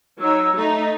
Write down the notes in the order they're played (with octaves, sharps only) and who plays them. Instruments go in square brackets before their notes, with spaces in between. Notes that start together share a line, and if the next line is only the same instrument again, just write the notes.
[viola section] F#3 C#5 [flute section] D#4 E6
[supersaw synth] A3 [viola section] D#4 [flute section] A#5